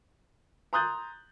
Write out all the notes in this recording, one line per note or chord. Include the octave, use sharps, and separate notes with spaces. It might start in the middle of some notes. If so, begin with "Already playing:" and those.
A#5 C6 D#6 F#6 G6 A6